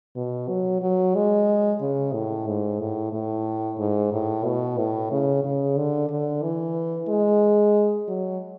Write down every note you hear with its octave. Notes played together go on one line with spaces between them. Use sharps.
B2
F#3
F#3
G#3
C#3
A2
G#2
A2
A2
G#2
A2
B2
A2
C#3
C#3
D3
D3
E3
G#3
F#3